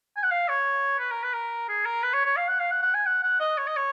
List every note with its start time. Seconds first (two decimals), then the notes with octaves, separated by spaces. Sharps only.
0.17 G#5
0.23 F#5
0.31 F5
0.48 C#5
0.99 B4
1.11 A#4
1.23 B4
1.33 A#4
1.69 G#4
1.85 A#4
2.03 B4
2.13 C#5
2.25 C#5
2.37 F5
2.48 F#5
2.60 F5
2.71 F#5
2.82 F#5
2.94 G#5
3.06 F#5
3.23 F#5
3.40 D#5
3.57 C#5
3.67 D#5
3.76 C#5